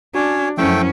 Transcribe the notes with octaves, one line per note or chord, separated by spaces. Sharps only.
C#4 D4 F#4 C#5
F#2 F3 A3 C#4 E4 C5 E5 G5